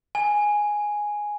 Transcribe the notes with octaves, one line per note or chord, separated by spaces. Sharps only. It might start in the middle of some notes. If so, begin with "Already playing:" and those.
G#5